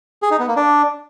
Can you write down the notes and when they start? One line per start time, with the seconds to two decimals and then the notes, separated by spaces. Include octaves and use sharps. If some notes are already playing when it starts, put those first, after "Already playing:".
0.22 G#4
0.31 D#4
0.39 B3
0.48 A#3
0.56 D4